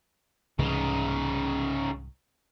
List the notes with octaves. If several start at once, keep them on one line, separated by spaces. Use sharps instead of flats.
C2 G#2 C#3 E3 D#4